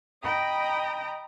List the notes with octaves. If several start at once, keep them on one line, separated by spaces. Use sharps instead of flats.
D#5 G5 A#5 B5 D#6